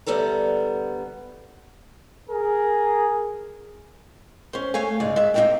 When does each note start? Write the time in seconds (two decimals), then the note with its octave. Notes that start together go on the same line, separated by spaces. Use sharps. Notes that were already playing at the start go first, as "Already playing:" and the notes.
0.06 D2 G3 B3 A4 A#5
2.30 G#4 A#4
4.53 C#4 C5
4.74 A3 C#5 F5 G#5
5.00 D2 G#2 C#3 D5
5.16 G#3 E5
5.34 A#3 C4 C#4 D#4 E5 G5